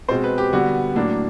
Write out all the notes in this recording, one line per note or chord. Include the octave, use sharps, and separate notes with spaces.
B2 G#3 C4 C5
B4
G4
D3 G3 B3 F#4
A2 F#3 A#3 D4